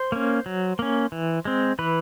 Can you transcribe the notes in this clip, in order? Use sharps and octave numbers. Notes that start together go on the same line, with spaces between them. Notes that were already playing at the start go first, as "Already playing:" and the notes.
Already playing: C5
A#3 C#4
F#3
A#3 C#4
E3
G#3 C4
E3 B4